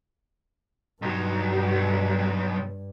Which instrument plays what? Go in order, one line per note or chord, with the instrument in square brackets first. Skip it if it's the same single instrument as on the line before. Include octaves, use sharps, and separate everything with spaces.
[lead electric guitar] B1 F#3 [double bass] G2